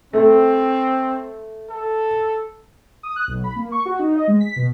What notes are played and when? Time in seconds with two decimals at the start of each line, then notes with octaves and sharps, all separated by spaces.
0.13 A3 C4
1.70 A4
3.03 D#6
3.16 F#6
3.28 B1
3.44 B5
3.56 A#3
3.72 C#6
3.86 F#4
3.99 D#4
4.16 D#5
4.28 G#3
4.40 B6
4.56 B2